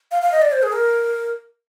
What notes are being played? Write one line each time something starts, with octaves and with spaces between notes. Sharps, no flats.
F5
F5
D#5
D5
C5
G#4
A#4